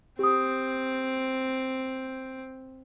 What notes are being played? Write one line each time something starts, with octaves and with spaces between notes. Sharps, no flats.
C4 G4 D#6